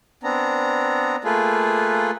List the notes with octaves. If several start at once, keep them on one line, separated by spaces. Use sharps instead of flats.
B3 C4 D4 A#5
A3 A#3 F4 G#4 A4 B4